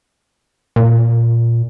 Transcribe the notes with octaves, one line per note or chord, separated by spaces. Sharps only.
A#2